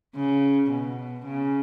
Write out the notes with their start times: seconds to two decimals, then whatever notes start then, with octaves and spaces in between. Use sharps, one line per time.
0.15 C#3
0.71 B2
1.25 C#3